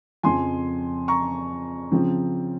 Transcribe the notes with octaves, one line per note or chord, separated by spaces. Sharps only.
F2 C#3 F3 G#5 C6
A#5 C#6
C#3 F3 C4